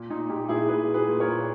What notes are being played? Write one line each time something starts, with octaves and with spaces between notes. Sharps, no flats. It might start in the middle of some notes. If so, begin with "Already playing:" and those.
Already playing: A#2
A#2 D#4
A#2 D#4 G4
A#2 E4 G#4
A#2 G#4 B4
A#2
G#4 B4
A#2
A#4 C#5
A#2